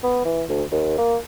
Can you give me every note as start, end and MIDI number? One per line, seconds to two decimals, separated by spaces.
0.03 0.23 59
0.25 0.43 52
0.49 0.64 38
0.72 0.96 39
0.98 1.17 58